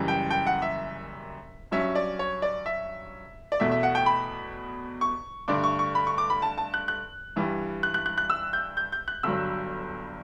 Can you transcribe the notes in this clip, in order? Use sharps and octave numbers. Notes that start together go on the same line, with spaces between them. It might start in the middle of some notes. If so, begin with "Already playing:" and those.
Already playing: F#1 F#2 E3 G3
G5
G5
F#5
E5
G2 F#3 C#4 E5
D5
C#5
D5
E5
D5
E2 B2 A3 E5
E5
F#5
G5
B5
C#6
G2 D3 A3 D4 D6
C#6
C#6
B5
C#6
D6
B5
A5
A5
F#6
F#6
G2 E3 G3
F#6
F#6
F#6
F#6
E6
G6
G6
G6
F#6
G1 G2 F#3 E6